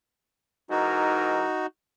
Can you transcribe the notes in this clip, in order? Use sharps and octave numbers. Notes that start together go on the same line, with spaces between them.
G#2 E3 D#4 F#4 A#4